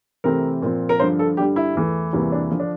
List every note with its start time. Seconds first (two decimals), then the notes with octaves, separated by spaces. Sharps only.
0.24 C3 E3 A3 C4 A#4
0.62 A#2 F3 C4
0.89 A#4
1.00 G2 D3 F3 C5
1.19 A4
1.37 G2 D3 G3 G4
1.56 E4
1.75 E2 E3 A3
2.13 E2 C3 E3 G3 A#3
2.32 D4
2.51 D3 F3
2.60 D4